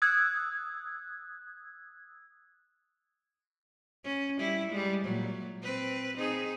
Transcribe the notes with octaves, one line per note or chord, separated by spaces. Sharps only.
D#6 E6 F#6 G#6
C#4
G3 E4
G3 G#3
A#2 F#3
C4 B4
C4 D#4 G#4